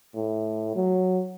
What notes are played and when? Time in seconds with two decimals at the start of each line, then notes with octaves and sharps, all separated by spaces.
0.15 A2
0.76 F#3